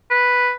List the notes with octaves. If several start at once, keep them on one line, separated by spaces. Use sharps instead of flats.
B4